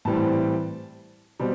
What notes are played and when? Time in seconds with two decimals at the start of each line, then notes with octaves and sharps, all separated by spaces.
0.05 A2 E3 G3 C4 A5
1.40 B2 G3 C4